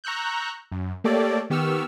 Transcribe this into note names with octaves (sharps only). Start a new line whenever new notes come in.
A#5 C#6 E6 F#6 G6
F#2
A3 A#3 G4 A4 C#5 D5
D#3 B3 G4 C#6 E6 F6